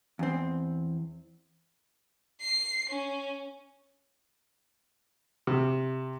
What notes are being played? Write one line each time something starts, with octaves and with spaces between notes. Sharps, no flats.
E2 C4
C7
C#4
C3